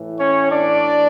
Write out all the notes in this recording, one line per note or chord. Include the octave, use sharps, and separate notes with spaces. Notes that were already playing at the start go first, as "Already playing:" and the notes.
Already playing: A2 E3
C#4 C#5
D4 D5